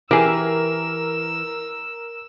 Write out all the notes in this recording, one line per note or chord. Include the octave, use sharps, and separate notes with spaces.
E3 G4 G#4 A#4 E6